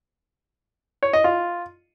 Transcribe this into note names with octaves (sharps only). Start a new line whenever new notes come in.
C#5
D#5
F4